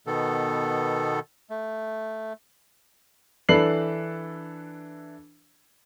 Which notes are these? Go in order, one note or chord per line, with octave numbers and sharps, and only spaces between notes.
B2 D#3 B3 A4
A3
E3 D4 A4 B4 C7 F#7